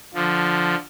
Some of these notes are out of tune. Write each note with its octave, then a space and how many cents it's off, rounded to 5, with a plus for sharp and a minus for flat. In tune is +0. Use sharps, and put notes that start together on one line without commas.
D3 +0 F3 +0